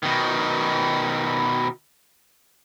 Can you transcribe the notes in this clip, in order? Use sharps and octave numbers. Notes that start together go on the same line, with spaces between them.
B2 D#3